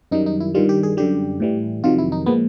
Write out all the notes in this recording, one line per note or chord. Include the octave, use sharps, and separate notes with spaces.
F#2 D#3 G3 D#4
D#4
E4
G2 D#3 G3 F4
G4
G#4
F#2 D3 G3 G4
A2 E3 G3
F2 C3 D#3 F#3 F4
E4
D#4
A#2 F3 G#3 B3